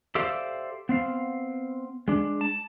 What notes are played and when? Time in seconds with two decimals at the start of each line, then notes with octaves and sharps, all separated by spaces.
0.15 G4 A4 C5 D5 E5 F5
0.89 B3 C4 F5
2.08 G#3 D4
2.41 A5